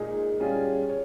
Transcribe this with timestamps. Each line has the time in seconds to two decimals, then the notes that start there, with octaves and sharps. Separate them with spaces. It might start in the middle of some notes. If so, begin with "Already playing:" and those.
Already playing: A#2 G#3 D#4 G#4
0.40 G3 C#4 F4 G#4
0.89 C#5